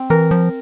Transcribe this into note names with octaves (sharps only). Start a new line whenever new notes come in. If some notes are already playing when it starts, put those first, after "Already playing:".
Already playing: C4
E3 A#4
F3